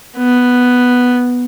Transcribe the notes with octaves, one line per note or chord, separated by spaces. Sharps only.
B3